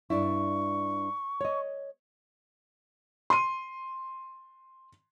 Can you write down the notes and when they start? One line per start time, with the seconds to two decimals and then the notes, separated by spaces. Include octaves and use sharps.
0.10 G2 D4 E4 C#6
1.41 C#5 D#5
3.30 C6 D#7